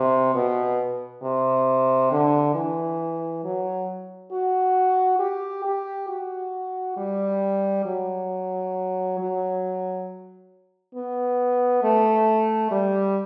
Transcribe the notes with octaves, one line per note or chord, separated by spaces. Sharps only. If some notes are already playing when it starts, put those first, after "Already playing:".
Already playing: C3
B2
C3
D3
E3
F#3
F#4
G4
G4
F#4
G3
F#3
F#3
B3
A3
G3